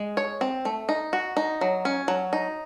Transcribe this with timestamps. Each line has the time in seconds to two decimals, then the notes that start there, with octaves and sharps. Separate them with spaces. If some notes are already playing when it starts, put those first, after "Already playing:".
Already playing: G#3
0.17 C#5
0.41 C4
0.65 A3
0.89 D#4
1.13 F#4
1.37 D#4
1.61 F#3
1.85 C#4
2.08 F#3
2.33 D#4